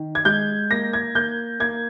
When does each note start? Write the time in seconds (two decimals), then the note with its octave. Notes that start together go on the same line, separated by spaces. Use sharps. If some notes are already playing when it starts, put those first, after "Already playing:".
Already playing: D#3
0.15 G#6
0.25 G#3 G6
0.71 A#3 A#6
0.93 G#6
1.15 A#3 G6
1.60 A#3 G#6